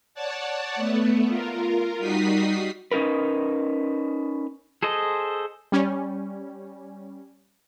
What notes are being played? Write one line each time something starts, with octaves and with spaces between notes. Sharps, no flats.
C#5 D5 F#5 A5
A3 B3
F4 A#4
G3 D#4 F#4 D#6 B6 C7
C#4 D#4 F#4 A#4 B4
G#4 A4 C5 D#5
G3 C#4